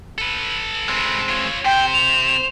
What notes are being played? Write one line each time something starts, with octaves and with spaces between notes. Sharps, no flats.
A4 B4
G#3 C4
F4 C#5
C3 C5 G5
F7